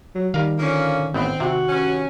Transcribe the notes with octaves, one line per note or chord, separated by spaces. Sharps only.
F#3
D#3 G3 A#4 F5
D3 F3 A#3 C#4
A1 B3 C4
C3 F#4
G2 C#4